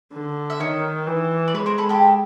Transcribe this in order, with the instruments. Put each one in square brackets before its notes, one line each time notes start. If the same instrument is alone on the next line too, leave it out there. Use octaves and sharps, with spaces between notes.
[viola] D3
[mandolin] E5
[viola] D#3 [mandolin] C#5 D#5
[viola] E3
[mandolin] D5
[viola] G#3 [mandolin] B4 C#5
[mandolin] A#4 C5
A4 B4
G4 A4